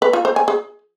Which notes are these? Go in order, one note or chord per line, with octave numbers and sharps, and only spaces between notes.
B4
F4
C5
G#5
G#4